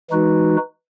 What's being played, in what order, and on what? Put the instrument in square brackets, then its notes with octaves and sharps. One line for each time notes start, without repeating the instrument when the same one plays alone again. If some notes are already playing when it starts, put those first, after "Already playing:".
[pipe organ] E3 G#3 D#4 F#4 B4